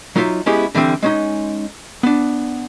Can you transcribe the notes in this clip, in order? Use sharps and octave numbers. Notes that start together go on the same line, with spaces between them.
F#3 D#4 F4 E5
G#3 B3 C#4 E4 G4 G#4
D3 E3 G3 C4
G#3 C#4 D#4
B3 D4